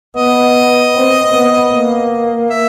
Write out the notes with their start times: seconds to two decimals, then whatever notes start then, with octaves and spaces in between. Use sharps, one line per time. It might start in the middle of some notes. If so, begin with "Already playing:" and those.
0.16 B3 D#5
0.95 C4
1.33 B3
1.73 A#3
2.51 E5